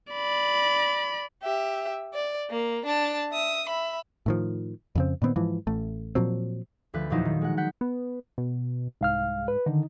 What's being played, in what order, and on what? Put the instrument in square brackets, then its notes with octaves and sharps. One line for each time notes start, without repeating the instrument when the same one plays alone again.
[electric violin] D5 B5
[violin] G4 E5
D5
A#3
D4 A5
E5 D#6
E5 B5
[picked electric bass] A2 D#3 F3
F2 C#3 C4
A#2 D#3 B3 C4
G#2 E3 F3
A1 A3
A#2 F3 F#3 C4
[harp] D2 F3 B4
E2 A#2 F3 F#3 D#4 E4
D#3
G#3 F#5
F#5 G6 B6
[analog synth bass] B3
B2
[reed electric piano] C2 F5 F6 [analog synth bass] G#2
[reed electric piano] B4
[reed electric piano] D3 D#3 [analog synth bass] D#4